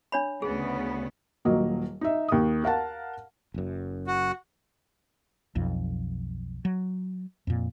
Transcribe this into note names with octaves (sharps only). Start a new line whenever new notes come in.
D4 C#5 B5
D2 C#3 B3 G#4
D#1 F#3 A#3 D#5
D#4 E5
D#2 D#6
A#4 F5 F#5 A5
F#1 F#2
F#4
B1 F2
F#3
F2 A#2